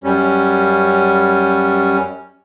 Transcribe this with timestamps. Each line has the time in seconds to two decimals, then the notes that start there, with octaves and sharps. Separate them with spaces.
0.04 F#2 G3 C#4